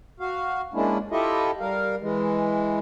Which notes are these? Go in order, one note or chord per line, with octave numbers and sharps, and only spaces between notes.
F#4 F5
G#3 A#3 C#4 D4 E4
E4 F4 G4 A4 D#5 E5
G3 A#4 F5
E3 G#3